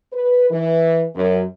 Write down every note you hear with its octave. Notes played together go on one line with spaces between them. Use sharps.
B4
E3
F#2